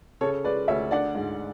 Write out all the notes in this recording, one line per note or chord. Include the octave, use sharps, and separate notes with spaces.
C#3 A4 C#5
G#3 B4 D5
D2 C#5 E5
D4 D5 F#5
G#2